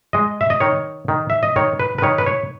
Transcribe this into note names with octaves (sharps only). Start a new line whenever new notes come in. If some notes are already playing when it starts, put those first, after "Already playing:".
G#3 D#5
E5
D#5
D#3 C#5
D#3
E5
D#5
D#3 C#5
B4
B4
D#3 C#5
B4
C#5